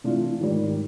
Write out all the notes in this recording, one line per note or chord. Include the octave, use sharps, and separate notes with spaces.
C3 E3 A3 D4 F4
G#2 D#3 G3